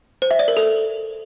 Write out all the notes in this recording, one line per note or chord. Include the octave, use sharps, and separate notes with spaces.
C5
E5
D5
A#4
A4